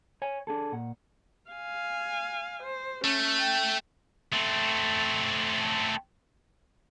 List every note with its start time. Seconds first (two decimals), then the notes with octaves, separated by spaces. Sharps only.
0.22 C#5 G#5
0.47 D4 G#4 A4
0.72 A#2 F#5
1.51 F5 G#5
2.62 C5
3.04 A3 C#4
3.39 G5
4.32 A3 C4